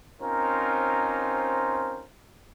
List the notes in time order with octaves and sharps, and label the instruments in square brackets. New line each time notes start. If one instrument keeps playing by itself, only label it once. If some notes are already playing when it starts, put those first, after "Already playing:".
[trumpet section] C4 C#4 D#4 F4 A#4 C5